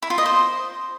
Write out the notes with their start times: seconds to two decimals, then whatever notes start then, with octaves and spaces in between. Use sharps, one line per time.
0.02 E4
0.10 F4
0.18 D#5
0.26 C5